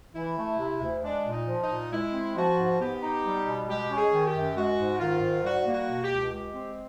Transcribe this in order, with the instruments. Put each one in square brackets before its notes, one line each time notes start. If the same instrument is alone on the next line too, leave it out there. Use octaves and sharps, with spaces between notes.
[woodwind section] E3 [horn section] E4
[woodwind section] A3
C3
D2
[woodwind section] G#3 [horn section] D4
[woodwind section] A#2
[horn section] D#4
[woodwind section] F3
[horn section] D#4
[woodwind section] A#2
[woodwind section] G#3 [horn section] E4
[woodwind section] C4
[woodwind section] F3 [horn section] F#4
[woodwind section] G#2
[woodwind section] B3 [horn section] G4
[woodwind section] D#4
G3
B2
[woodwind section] G#3 [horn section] G4
[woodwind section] C#4
[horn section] G#4
[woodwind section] D#3
[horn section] G4
[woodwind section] F#2
[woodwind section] G#3 [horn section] F#4
[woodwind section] G#2
[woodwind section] D#3 [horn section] F4
[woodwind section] G#2
[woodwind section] G3 [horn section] F#4
[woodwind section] A#3
[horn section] F#4
[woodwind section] B2
[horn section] G4
[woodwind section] C#2
[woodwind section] G#3 [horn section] G4
[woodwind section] C4